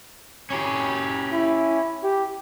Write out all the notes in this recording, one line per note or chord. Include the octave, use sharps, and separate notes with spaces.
C#4 G4
E4
G4